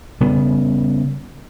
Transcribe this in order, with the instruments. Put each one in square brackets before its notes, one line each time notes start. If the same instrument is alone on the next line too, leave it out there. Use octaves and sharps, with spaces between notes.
[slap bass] C#3 G3 B3